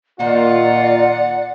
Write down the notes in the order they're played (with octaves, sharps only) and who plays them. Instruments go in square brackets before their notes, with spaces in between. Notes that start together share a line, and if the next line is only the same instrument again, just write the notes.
[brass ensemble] A#2 F4 [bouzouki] D#3 D#4 C5 [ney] D5 [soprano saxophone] F#5